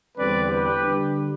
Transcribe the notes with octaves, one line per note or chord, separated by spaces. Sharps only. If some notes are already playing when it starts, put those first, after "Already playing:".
E2 D3 G3 C4 B4 D5
G4 B4
D3 G3 D4